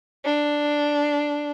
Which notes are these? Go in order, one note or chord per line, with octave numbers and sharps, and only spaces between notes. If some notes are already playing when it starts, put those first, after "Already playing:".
D4